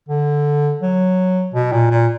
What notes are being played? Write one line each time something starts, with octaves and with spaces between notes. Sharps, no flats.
D3
F#3
B2
A#2
A#2